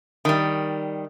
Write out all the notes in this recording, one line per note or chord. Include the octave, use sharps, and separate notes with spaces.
D#3 G3